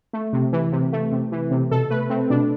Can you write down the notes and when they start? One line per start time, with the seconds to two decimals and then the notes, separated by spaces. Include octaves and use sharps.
0.13 A3
0.33 C3
0.53 E3
0.72 C3
0.93 A3
1.12 C3
1.32 E3
1.51 C3
1.71 B2 A4
1.90 A3 B4
2.10 A3 C4
2.30 B2 D4